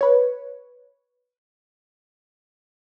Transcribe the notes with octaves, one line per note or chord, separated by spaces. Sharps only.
B4 C#5